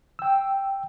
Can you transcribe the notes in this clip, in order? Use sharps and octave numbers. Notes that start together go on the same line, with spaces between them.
G5 E6